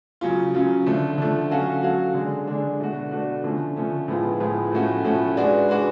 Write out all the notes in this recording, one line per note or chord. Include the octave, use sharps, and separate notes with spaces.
C#3 F#3 C#4 F4
C#3 F#3 C#4 F4
D3 F3 A3
D3 F3 A3
F#3 C#4 F#4 A4 F5
F#3 C#4 F#4 A4 F5
D3 G#3 D4
D3 G#3 D4
B2 A3 D4 F#4
B2 A3 D4 F#4
D3 F3 A3 C#4
D3 F3 A3 C#4
A2 F3 G#3 B3 F4
A2 F3 G#3 B3 F4
A2 F3 A3 C#4 F#4
A2 F3 A3 C#4 F#4
G#3 D4 F#4 B4 D5
G#3 D4 F#4 B4 D5